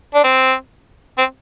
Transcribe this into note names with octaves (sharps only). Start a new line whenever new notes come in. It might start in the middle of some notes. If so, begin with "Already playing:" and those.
D4
C4
C4